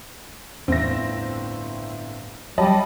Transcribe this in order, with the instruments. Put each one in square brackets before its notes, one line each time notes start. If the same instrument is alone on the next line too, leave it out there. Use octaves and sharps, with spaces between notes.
[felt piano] G1 A2 E5 [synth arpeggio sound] E2 [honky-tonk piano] C4 A#6
[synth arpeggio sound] F#3 [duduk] G3 [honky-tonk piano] D#5 A5 B5